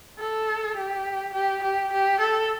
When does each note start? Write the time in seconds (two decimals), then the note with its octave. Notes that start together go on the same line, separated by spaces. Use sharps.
0.19 A4
0.77 G4
1.34 G4
1.63 G4
1.92 G4
2.21 A4